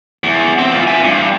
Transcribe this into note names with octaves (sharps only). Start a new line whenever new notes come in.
E2
C4
E3 F4
E5 G#5
G2